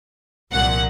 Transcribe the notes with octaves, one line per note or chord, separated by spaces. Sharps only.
C2 A#2 F3 F#5